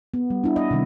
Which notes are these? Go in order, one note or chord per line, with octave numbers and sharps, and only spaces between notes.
B3
G3
D4 E4
D#5
C3 D#3 G3